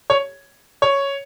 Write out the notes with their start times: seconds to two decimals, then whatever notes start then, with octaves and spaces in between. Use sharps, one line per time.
0.10 C#5
0.82 C#5